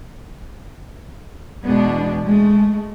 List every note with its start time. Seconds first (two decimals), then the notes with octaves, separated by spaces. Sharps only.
1.63 E2 B2 G#3 B3 D4
2.24 G#3 A3